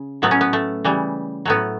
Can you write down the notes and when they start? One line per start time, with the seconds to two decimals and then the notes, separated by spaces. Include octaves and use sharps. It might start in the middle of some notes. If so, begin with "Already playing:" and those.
Already playing: C#3
0.22 A2 F#3 A3 B3
0.31 C#4
0.41 B3
0.53 A3
0.85 C#3 E3 G3
1.45 A2 F#3 A3 B3